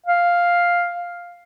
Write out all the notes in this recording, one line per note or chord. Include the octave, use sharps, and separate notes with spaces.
F5